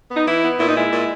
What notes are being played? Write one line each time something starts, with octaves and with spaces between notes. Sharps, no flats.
B3
D#4
E3 E4
B3
A#2 E4
D#4
G#3 E4
A#2